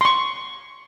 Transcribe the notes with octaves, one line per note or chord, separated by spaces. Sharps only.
C6 C#6